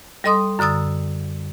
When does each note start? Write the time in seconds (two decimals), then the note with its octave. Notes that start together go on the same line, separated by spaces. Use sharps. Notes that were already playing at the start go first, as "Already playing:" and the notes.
0.24 G3 A4 D#5 C6 D#6
0.59 F#2 D3 D#6 E6 A6